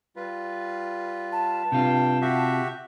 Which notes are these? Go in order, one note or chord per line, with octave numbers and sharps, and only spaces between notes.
G3 F4 B4
A5
G2 C3 F4 G5
F#4 G4 E5